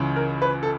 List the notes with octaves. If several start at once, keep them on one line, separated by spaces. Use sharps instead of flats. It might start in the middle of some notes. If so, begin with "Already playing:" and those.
Already playing: C#2 C#3 E3
A#4
B4
A4